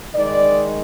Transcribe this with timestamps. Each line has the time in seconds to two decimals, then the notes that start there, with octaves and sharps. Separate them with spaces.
0.14 D#3 G#3 D#4 D5